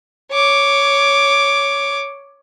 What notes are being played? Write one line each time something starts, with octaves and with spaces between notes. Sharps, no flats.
C#5 D6